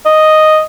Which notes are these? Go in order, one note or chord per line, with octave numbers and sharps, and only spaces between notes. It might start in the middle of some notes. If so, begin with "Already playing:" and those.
D#5